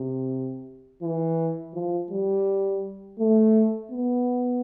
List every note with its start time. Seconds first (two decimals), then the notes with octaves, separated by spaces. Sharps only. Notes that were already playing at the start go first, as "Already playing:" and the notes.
Already playing: C3
1.02 E3
1.74 F3
2.11 G3
3.19 A3
3.92 B3